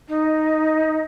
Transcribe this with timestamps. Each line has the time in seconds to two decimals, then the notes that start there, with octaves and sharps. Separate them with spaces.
0.08 D#4